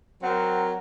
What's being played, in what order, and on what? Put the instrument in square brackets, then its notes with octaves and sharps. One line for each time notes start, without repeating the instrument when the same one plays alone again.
[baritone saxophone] F#3 [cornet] C4 [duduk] A#4 [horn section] F#5